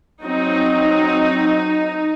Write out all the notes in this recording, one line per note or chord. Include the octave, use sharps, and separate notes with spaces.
F#3 C4 D#4